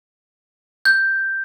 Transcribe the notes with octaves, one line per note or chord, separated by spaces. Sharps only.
G6